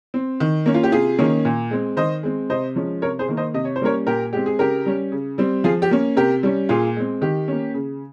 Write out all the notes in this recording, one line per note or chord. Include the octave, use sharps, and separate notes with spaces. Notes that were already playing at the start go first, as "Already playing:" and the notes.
C4
D#3
A#3 C#4
F4
G4
C3 F4 G#4
D#3 A#3 C#4
A#2
G#3 C4
D#3 C5 D#5
G#3 C4
C3 C5 D#5
F3 G#3 C#4
C3 A#4 C#5
G#4 C5
D#3 A#3
C5 D#5
C3 D#5
C#5
C5
G3 A#3 C#4 A#4 C#5
A#2 G4 A#4
G#3 C4 G4
G#4
C#3 G4 A#4
G3 C#4
C#3
G3 C4
F3 F4 G#4
G4
A#3 C#4
C3 G4 A#4
G3 C#4
A#2 F4 G#4
G#3 C4
D#3 G4
A#3 C#4
C#3